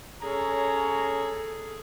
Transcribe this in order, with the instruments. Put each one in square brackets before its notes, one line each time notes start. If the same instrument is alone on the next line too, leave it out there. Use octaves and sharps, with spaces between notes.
[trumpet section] C#4 C#5 A#5 [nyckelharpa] G#4 A4